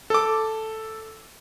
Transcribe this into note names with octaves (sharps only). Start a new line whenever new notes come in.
A4 D6